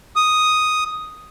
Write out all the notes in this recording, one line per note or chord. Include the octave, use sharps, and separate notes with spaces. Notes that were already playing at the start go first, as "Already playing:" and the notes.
D#6